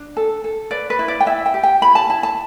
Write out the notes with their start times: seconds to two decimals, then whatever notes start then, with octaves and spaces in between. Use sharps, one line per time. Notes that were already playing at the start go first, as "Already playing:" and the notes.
Already playing: D4
0.17 A4
0.44 A4
0.71 B4 D5
0.90 B4
0.99 E4
1.08 D5
1.20 G5
1.26 E4 E5
1.46 G5
1.54 G4
1.63 G5
1.82 E4 B5
1.95 A5
2.10 E4 A5
2.23 A5